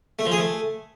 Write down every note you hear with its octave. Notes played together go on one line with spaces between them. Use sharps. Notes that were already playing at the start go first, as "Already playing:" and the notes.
A3
F3
G#4
A3